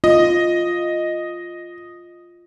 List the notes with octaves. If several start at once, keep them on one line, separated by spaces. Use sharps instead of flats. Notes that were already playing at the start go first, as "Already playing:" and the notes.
F4 D#5